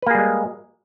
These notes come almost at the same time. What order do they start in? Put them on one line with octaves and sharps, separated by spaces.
B4 A#3 G#4 G3 G#3